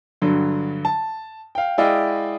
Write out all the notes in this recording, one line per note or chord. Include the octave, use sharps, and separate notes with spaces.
G2 D3 F#3
A5
F5 G5
G#3 E4 D5 D#5 F5 G5